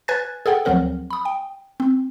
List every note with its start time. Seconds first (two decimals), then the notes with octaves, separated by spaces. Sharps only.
0.08 B4 G#5 F#6 G#6 A6
0.46 G#4 A4 F#5 G5
0.65 D2 F3 F#3 C4 A#4 F#5
1.10 B5 D#6
1.25 G5
1.80 C4